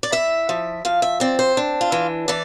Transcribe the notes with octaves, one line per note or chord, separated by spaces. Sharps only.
D5
E4 E5
F3
F3 F5
E5
C4 D5
C5
D4
F4
E3
E3 D5